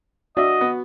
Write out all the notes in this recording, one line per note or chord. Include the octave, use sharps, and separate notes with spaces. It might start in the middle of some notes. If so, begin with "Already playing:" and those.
D4 F#4 D#5 E5
B3